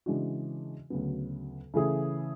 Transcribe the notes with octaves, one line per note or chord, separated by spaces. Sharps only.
C#3 E3 G#3 D4 F#4
D2 C#3 F#3 B3
C#3 E3 A3 E4 G#4